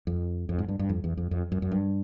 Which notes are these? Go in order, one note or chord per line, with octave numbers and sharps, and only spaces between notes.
F2
F2
G#2
G2
G2
F2
E2
F2
F2
F#2
F#2
G2